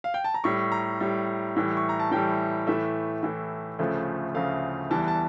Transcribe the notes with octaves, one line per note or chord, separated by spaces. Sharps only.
F5
G5
A5
A#5
A2 G3 C#6
A#5
A2 G3
A2 E3 G3
C#6
A#5
A5
A2 E3 G3 G5
A2 E3 A3 E5
A2 E3 A3
D2 C#3 F3 A3
D2 C#3 F3 A3 F5
E2 E3 G3 A5
A5